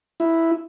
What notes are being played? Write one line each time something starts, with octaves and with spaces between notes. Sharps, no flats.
E4